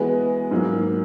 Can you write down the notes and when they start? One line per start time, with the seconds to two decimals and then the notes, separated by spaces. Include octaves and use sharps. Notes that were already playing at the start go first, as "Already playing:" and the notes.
Already playing: E3 G#3 B3 F#4
0.51 G#2 F#3 A#3